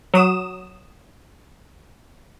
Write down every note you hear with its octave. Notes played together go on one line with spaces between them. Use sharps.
F#3 D#6 E7